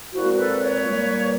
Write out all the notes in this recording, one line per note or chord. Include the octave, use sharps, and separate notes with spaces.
A#2 F3 G#3 C4 E4 F#4
A4 B4
B4 C#5
A#2 G3 A#3